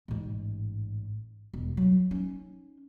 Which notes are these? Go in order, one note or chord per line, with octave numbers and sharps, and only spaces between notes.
A1 G#2
E1
F#3
C#4 D#4